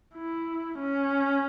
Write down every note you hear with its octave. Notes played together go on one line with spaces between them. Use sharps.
E4
C#4